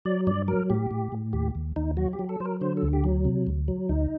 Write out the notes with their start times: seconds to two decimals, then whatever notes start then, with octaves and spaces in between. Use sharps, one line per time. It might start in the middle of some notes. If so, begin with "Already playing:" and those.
0.05 F#3 D5
0.27 G2 D5
0.48 F#3 A#4
0.70 A2 G4
0.91 A2
1.12 A2
1.33 D#2 G4
1.55 D#2
1.76 D#2 D#4
1.97 F#3 F#4
2.13 G4
2.19 F#3
2.29 A4
2.40 F#3 C5
2.45 A#4
2.61 D3 C5
2.77 A4
2.82 D2
2.93 G4
3.04 F#3
3.25 C3
3.47 D2
3.68 F#3
3.89 D2 D#4